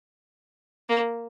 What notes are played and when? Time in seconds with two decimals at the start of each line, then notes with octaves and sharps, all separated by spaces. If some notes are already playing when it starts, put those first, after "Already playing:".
0.89 A#3